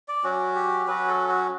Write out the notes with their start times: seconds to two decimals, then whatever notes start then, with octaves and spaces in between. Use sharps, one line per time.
0.08 D5
0.24 F#3 C#4 F#4
0.55 G4
0.87 F#3 C#4 F#4 B4
1.08 A4
1.29 F#4